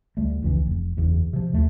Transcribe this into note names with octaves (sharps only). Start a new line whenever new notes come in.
D2 G3 A3
F1 C#2 E3
F1
F#1 E2
C3 F3
D#2 A3